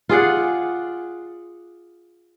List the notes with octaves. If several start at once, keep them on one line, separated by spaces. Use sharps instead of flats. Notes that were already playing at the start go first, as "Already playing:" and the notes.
F4 G#4 D5 F#5